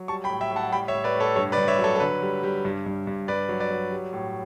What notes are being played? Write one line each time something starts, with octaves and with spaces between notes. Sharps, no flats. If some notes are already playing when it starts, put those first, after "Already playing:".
Already playing: F#3
G3 A5 C#6
G5 B5
A2
E5 G5
A2
F#5 A5
G3 G5 B5
C#5 E5
A2
B4 D5
A2
A4 C#5
G2 A4 C#5
B4 D5
G2
C#5 E5
F#3
A4 C#5
A4
D3 B4
G3
G3
G2
G2
G2
G2 B4 D5
F#3
B4 D5
F#3
G3
A2